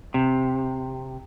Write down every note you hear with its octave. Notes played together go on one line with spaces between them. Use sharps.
C3